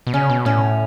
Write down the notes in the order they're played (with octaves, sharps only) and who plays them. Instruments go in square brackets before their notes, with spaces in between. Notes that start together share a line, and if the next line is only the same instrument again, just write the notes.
[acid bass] B2
[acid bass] C#3 [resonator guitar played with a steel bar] C#4
[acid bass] B2
[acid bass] A2 [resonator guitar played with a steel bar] C#4